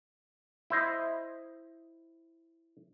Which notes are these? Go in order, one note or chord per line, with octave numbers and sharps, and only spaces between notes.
E4 C5 D#5